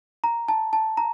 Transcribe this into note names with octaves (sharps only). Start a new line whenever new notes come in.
A#5
A5
A5
A#5